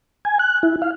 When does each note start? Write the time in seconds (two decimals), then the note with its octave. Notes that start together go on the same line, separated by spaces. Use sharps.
0.25 G#5
0.39 F#6
0.63 E4
0.82 F5